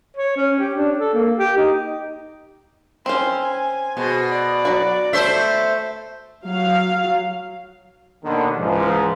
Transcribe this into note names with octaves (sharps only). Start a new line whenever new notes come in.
C#5
C#4
G4
D4
A4
A#3
G4
D#4
C4 C#4 C6
G#5
B2 G#4 C5
D5
F#3 F#4
A3 C5 E5
F#3 F5
D#2 B2 D3 D#3
C#2 G#2 E3 F3